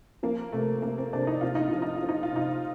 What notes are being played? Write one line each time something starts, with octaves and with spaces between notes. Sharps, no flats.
F3 A#3
C3 A3
C3 A#3
C4
C3 D4
D#4
C3 F4
D#4
F3 F4
D#4
F4
F3
D#4
F4
C3 D#4